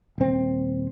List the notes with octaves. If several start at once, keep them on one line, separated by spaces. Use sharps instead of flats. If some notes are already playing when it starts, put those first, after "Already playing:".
D#1 C4